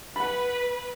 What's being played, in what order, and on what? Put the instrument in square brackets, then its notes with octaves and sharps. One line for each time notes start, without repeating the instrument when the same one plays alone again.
[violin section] B4 [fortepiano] F#5 B5